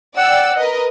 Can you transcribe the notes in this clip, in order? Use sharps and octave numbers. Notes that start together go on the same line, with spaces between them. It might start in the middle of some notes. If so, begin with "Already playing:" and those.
D5 F#5 G5 E6
A#4 B4 D#5